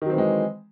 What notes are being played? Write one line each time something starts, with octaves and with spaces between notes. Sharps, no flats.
D#3 E3 F#3 G#3 C4